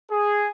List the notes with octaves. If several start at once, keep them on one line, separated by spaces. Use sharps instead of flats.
G#4